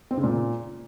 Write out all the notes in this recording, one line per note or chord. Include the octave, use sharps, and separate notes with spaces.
C4
C#3
A#2